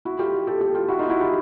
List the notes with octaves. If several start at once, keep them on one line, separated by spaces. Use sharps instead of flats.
E4 F#4
F4 G4
G4 A4
G4 A4
F4 G4
E4 F#4
D#4 F4
E4 F#4
F4 G4